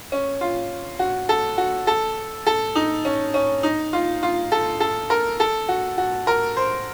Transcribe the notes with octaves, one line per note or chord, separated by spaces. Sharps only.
C#4
F4
F#4
A4
F#4
A4
A4
D#4
C#4
C#4
D#4
F4
F4
A4
A4
A#4
A4
F#4
F#4
A#4
C5